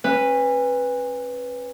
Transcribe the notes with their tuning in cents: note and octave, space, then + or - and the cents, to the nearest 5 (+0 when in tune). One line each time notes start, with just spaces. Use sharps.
C#4 -35 B4 +0